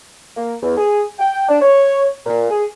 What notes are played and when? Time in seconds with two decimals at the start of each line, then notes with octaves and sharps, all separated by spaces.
0.37 A#3
0.62 E2
0.78 G#4
1.19 G5
1.49 D4
1.61 C#5
2.26 A#2
2.50 G#4